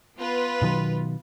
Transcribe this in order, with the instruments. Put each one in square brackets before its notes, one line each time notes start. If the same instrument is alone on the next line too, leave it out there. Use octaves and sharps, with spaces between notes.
[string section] B3 F4 B4
[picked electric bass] B2 D#3 F#3